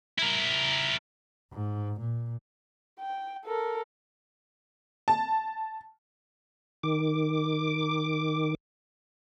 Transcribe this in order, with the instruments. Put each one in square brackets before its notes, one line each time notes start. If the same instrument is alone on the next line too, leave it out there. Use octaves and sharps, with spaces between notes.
[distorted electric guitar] E4 A#4
[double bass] G#2
A#2
[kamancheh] G5
A4 A#4
[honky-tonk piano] A5
[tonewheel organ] D#3 D6